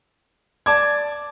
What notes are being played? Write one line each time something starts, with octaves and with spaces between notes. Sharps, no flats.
D5 A5 D6 G#6